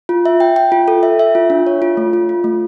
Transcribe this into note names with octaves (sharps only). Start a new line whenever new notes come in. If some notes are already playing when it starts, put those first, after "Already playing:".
F4
E5
G5
G5
F4
A4
E5
E5
F4
D4
C#5
F4
A3
F4
F4
A3